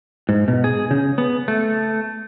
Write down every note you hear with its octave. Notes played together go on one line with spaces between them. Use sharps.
G#2
B2
G#4
C#3
B3
A3